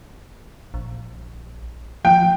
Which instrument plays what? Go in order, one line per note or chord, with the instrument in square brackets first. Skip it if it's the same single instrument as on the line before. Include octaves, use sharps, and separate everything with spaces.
[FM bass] A#1
[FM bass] F3 [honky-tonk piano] G5